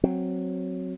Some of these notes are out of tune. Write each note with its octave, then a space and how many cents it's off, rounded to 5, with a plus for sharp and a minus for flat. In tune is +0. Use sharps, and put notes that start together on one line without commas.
F#3 +0 C4 +0